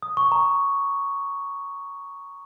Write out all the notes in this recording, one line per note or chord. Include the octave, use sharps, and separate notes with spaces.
D#6
C#6
A#5